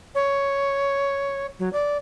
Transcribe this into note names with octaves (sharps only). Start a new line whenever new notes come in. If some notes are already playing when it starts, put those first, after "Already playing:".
C#5
F#3
D5